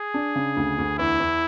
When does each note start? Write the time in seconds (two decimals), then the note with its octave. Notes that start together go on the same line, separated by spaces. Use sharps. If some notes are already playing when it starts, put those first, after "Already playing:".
Already playing: G#4
0.14 D4
0.35 C#3
0.57 D2
0.78 D2
0.99 E2 E4
1.20 E2